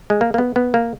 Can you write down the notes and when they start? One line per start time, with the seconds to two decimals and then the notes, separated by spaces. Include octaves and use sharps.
0.10 G#3
0.21 A#3
0.34 A#3
0.38 B3
0.56 B3
0.74 A#3